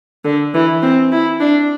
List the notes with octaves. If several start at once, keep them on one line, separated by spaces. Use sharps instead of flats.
D3
E3
C4
E4
D4